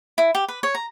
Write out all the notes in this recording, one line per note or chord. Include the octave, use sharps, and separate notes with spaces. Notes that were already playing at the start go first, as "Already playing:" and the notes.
E4
G4
B4
C#5
A#5